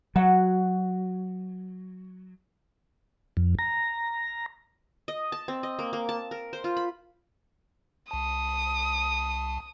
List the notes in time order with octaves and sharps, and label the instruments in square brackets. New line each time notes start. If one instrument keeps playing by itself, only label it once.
[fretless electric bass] F#3 [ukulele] F#4 F#5
[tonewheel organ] F2
A#5
[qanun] D#5
A5
C4
D#5
A#3
A#3
A5
A#4
C5
F4
B5
[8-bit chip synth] C2 A5 [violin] D#6